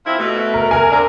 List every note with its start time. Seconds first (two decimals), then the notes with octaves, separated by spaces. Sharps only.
0.06 F3 C4 E4
0.18 B2 A3
0.54 A#4
0.71 A#4 G#5
0.90 A#3 C4 D4